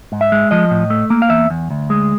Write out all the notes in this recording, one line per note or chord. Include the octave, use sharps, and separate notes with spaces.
G#2
E5
G#3
F3 D#5
A2
A3
A#3
F5
E2 E5
E2
D2
G#3